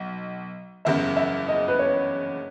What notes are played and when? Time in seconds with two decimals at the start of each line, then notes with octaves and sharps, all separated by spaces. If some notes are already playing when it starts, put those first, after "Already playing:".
Already playing: B1
0.85 F#1 E2 C#3 E5
1.17 E5
1.48 D#5
1.68 B4
1.79 C#5